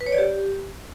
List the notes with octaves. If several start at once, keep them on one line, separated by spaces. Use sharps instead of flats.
B4
C#5
D5
G4